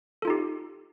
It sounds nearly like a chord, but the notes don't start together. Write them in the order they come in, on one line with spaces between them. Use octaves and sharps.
A4 F4 D#4 G4